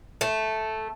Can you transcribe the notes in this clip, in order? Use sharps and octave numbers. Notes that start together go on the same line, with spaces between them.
A3